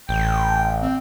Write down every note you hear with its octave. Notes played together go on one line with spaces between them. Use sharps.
A1 G5
C4